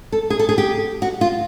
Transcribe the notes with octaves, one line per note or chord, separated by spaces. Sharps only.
A4
G#4
A4
G#4
G4
F#4
F4